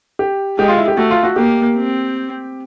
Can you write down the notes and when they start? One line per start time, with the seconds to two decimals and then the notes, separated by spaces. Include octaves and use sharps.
0.19 G4
0.58 G#3 G4
0.68 F4
0.78 E4
0.88 G4
0.97 A3 F#4
1.11 F4
1.23 F#4
1.36 A#3 G4
1.76 C4